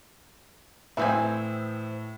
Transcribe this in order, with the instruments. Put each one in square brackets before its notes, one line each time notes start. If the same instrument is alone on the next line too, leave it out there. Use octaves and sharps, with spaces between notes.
[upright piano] A2 [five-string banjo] E3 C4 G#5 [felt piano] E5 D#6 E6